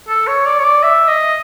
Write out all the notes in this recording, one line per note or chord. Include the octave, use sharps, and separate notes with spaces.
A4
C#5
D5
C#5
D5
E5
D#5